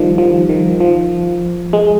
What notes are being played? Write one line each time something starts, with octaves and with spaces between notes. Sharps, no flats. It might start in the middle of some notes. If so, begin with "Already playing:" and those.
Already playing: D#3 F3 G3
F3
D#3
F3
G#3